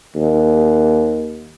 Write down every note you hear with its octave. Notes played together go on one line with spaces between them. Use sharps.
D#2